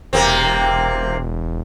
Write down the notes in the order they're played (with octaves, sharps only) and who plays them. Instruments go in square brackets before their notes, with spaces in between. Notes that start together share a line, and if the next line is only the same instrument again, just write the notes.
[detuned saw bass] E1 [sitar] C3 A#3 C4